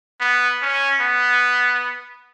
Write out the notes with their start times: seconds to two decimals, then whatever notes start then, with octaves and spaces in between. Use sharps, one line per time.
0.20 B3
0.62 C#4
1.01 B3